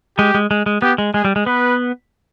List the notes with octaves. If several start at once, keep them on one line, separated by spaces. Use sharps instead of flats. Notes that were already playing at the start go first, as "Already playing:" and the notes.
G#3 G4
G#3
G#3
G#3
B3 G4
G#3
G#3 G#4
G3
G#3
B3 B4